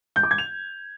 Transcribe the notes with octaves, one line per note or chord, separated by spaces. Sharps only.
G6
D6
G#6
F7